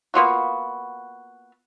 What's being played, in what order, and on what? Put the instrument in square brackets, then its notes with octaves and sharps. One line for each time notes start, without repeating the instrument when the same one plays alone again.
[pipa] A#3 B3 F4 F#4